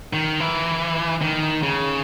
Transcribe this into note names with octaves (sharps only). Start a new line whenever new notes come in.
D#3
E3
D#3
C#3